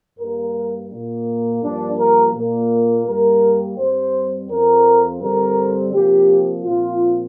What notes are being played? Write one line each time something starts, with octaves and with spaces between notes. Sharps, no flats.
G2 G3 A#3 A#4
A#2 A#3
G2 F3 A#3 D4
A#4
A#2 A#3
G2 G3 A#3 A#4
G2 G3 C4 C5
F2 F3 C4 A#4
G2 D3 G3 C4 A#4
C3 F3 A#3 G4
A#2 F3 C4 F4